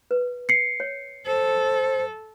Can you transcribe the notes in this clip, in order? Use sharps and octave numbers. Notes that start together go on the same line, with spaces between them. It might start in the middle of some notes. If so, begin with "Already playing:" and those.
B4
C7 C#7
C#5
A4 C5